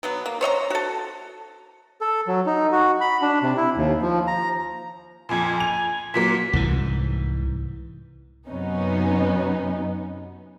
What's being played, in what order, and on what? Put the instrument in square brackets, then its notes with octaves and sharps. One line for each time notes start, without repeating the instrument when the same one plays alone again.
[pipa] B2 F#3 B3
A#3
C5 C#5 D#5 A#5
F#4 A4
[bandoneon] A4
F#3
D#4
F#4
B5
D4
C3
E4
D#2
F3
A#5
[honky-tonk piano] F2 A#2 [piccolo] G#5
[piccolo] G#5
[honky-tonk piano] F7
[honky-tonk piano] A#2 F#3 A#3 [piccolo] B6
[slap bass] C2 G#2 E3
[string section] F#2 C3 F#3 B3 C#4 D#4